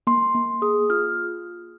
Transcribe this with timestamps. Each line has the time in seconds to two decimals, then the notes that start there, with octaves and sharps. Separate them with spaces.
0.07 A#3 C6
0.35 A#3
0.62 G#4 D#6
0.90 F4 F6